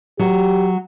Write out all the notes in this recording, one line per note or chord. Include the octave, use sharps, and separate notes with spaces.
F#3 G4